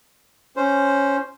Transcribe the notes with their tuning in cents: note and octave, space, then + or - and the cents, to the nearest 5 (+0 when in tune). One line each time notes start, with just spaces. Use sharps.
C#4 +0 C5 +0